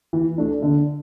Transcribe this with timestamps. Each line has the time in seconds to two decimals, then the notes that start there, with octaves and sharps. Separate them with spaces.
0.13 E3
0.38 A3 D4
0.62 D3